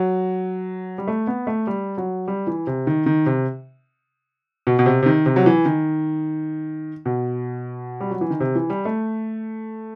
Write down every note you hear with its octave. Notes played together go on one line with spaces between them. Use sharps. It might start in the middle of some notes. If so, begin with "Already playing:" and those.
Already playing: F#3
G3
A3
B3
A3
G3
F#3
G3
E3
C3
D#3
D#3
C3
B2
B2
C3
C3
D#3
C3
F#3
E3
D#3
B2
G3
F#3
E3
D#3
C3
E3
G3
A3